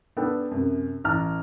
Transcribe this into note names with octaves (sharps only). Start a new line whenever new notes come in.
B3 D4 A4 G5
F#2 C3
A1 A5 A#5 F6